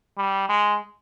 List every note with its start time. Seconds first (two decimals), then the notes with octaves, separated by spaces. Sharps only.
0.17 G3
0.49 G#3